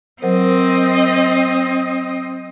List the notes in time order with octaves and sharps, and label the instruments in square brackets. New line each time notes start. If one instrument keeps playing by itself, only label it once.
[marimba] F#3 A#4 C5 [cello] C4 D#5